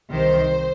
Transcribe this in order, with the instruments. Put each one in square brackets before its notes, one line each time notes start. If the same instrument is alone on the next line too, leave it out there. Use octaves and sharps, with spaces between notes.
[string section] C2 C3 D#3 C5